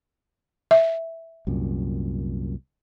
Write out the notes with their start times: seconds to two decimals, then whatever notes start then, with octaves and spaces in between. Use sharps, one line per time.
0.71 E5
1.47 C2 F#2 A#2